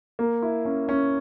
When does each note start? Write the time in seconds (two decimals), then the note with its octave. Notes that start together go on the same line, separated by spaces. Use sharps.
0.19 A#3
0.42 E4
0.65 C#4
0.89 C#4